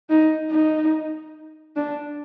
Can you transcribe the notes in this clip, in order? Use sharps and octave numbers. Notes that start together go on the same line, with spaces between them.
D#4
D#4
D4